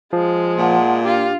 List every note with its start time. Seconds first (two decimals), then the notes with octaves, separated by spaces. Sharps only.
0.13 F3 G#3
0.57 A#2 F#5 A5 C6
1.05 D4 F4 G4